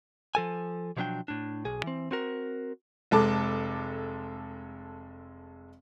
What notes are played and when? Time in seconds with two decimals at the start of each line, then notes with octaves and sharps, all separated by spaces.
0.35 F3 A4 G#5
0.97 B2 F3 F#3 C4 D4 G5
1.28 A2 D4
1.65 B1 G#4
1.84 E3 C4
2.11 C4 F#4 A#4
3.11 F1 G#3 A4 A5 D6